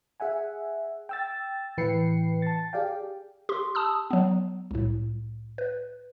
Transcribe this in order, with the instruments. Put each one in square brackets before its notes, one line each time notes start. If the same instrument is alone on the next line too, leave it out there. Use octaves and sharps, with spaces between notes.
[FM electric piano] G#4 E5 F#5 G#5
G5 E6 A6
A2 E3 B4 G5 C7 C#7
A5 A6
G4 G#4 D5 F5 G5
[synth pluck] G4 C6
A5 D#6 E6
F#3 B3
C2 A2
B4